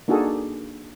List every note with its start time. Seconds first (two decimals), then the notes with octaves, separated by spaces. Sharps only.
0.08 A#3 D4 D#4 F#4 G#4 A4